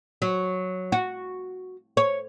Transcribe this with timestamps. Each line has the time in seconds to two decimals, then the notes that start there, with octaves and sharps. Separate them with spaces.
0.22 F#3
0.92 F#4
1.97 C#5